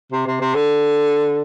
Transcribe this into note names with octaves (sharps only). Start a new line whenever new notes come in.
C3
C3
C3
D3